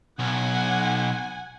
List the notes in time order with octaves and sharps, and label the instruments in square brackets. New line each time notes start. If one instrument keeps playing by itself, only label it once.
[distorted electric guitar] B1 [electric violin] F#5 G#5